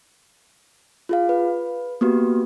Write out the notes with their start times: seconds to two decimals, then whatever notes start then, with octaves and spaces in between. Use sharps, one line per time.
1.09 F4 G#4 F5
1.29 B4
2.01 A#3 B3 F#4 G4 B4